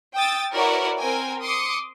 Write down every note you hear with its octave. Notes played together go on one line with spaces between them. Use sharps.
G5 D#6 E6 A6
E4 F#4 A#4 B4 C#5 D5
C4 A#4 G5 G#5
C6 D6 D#6 C#7